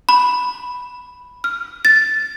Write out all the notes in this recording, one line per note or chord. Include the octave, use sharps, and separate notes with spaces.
B5
F6
A6